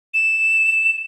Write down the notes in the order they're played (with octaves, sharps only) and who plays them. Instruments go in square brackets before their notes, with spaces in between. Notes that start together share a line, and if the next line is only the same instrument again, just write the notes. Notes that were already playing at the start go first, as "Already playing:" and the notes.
[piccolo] E7